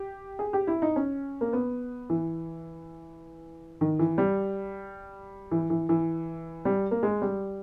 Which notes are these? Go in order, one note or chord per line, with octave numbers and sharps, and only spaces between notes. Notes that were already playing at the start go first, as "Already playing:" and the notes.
Already playing: G4
G#4
G4
E4
D#4
C#4
A#3
B3
E3
D#3
E3
G3
E3
E3
E3
G3
A#3
G#3
G3